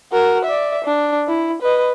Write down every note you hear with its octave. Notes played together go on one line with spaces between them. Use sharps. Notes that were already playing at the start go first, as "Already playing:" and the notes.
F#4 A#4
D5 E5
D4
E4
B4 D#5